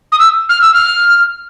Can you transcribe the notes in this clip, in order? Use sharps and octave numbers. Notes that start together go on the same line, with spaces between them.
D#6
E6
F6
E6
F6